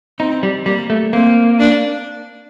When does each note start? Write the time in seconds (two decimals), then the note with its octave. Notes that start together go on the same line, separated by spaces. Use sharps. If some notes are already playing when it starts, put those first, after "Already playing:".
0.19 C4 D#4
0.43 G3
0.66 G3 A#3
0.90 A3
1.13 A#3 C4
1.60 D4